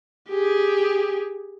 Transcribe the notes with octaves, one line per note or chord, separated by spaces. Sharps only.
G4 G#4